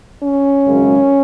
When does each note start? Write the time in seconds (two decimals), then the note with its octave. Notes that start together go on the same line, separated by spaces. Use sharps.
0.21 C#4
0.66 G#1 F#2 C#3 G#3